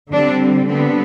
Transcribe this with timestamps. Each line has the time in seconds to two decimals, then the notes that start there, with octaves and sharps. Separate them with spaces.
0.11 D3 G3 C4 D4
0.68 D3 G3 B3 C4